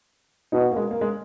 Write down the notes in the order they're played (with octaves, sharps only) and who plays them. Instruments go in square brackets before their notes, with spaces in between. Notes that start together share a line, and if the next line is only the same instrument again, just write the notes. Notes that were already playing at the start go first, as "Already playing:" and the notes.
[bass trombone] B2 [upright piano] D#4
[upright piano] A#3
G#3
A#3
G#3